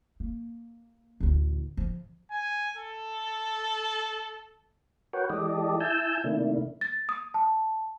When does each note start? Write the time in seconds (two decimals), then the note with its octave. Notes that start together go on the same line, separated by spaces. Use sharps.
0.20 A#3
1.20 A1 D2
1.77 F3
2.31 G#5
2.77 A4
5.13 F#4 A#4 B4 C#5 F#5 G5
5.30 E3 G#3 G4 A4 D5 D#5
5.80 E4 G#5 A5 E6 G6
6.24 C3 D#3 A3 A#3 D4 E4
6.81 A6
7.09 D#6
7.34 A5